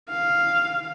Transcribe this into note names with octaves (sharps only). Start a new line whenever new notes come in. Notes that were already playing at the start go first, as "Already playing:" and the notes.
F5